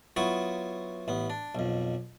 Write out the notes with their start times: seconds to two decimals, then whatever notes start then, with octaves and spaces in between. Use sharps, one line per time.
0.17 F#3 B3 E4 F4 C#6 D#6
1.08 A1 B3
1.30 D4
1.55 B1 F2